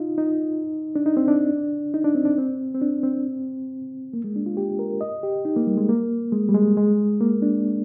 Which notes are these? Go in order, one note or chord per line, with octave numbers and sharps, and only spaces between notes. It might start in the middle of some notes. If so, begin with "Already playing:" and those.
Already playing: D#4 F4
D#4
D4
D#4
C4
D4
D#4
D4
C4
D4
C4
C4
D4
C4
A#3
G#3
D4
F4
G4
A#4
D#5
G4
D#4
A#3
G3
G#3
A#3
G#3
G3
G#3
G#3
A#3
D4